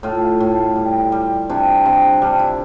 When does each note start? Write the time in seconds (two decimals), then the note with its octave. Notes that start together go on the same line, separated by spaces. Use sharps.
0.03 A2 F4
0.40 A2
0.76 G3
1.12 G3
1.50 C3 D4
1.85 C3
2.22 G3 D4
2.39 E4